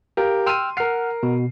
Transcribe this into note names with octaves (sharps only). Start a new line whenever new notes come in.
G4 A#4 F5
G5 C6 E6 F6 D#7
A#4 F#5 F6 C7
B2